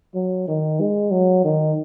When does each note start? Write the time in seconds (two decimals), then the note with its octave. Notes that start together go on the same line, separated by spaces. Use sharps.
0.15 F#3
0.48 D#3
0.80 G#3
1.11 F#3
1.44 D#3